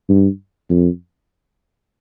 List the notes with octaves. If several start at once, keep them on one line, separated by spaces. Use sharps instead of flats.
G2
F2